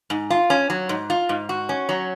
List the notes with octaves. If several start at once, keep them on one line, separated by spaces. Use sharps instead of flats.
G#2
F4
C#4
F#3
G#2
F4
G#2
F#4
C#4
F#3